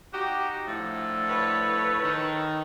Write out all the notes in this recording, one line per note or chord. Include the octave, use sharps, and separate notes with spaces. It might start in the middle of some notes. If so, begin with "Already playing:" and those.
D#4 F#4 G4
A2 D3 F3 A4
B4 C#5
D#3